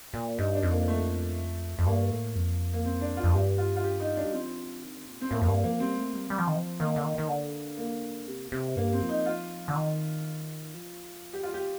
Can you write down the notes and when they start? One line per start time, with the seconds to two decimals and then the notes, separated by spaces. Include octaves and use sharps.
0.13 A#2
0.38 G2 D#4
0.55 D4
0.62 F2
0.71 A#3
0.88 A3
1.79 F2
1.86 G2 A#3
2.10 A2
2.35 F2
2.74 A#3
2.85 C4
3.01 D4
3.17 F4
3.23 F2
3.34 G2 G4
3.58 F4
3.76 F4
3.84 G4
4.00 D#4
4.17 D4
4.24 G3
4.32 F3 C4
4.82 D#3
5.07 A#2
5.21 C4
5.31 A2 A#3
5.41 F2
5.48 G2 A#3
5.64 F3 A#3
5.80 G3 C4
5.97 A3
6.14 G3
6.30 G3
6.38 F3
6.47 D#3
6.55 F3
6.79 D#3 A#3
6.96 D3
7.04 D#3
7.18 D#3
7.28 D3
7.77 A#3
8.27 C3
8.52 C3
8.76 G2 A#3
8.93 C4
9.02 F3
9.09 D#4
9.26 F4
9.68 D3
9.75 D#3
10.74 F3
11.33 G4
11.43 F4
11.54 G4